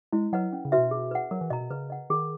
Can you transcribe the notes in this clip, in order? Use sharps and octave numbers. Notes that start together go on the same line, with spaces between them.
G#3 E4
F#3 B4 D#5 F#5
C#4
C#3
F#4 B4 E5
B2
G#4
B4 F#5
F#3 A#4
E3
B2 D#5 A#5
B2
C#3 B4
D#5 F#5
D#3 G#4